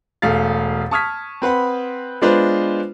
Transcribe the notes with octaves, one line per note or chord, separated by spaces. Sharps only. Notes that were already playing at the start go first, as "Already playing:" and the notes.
E1 A3 G#4 F5 A6
A5 C#6 D#6 F6 G#6 B6
C4 B4 F#5 B5
G#3 B3 D4 F4 B4 C5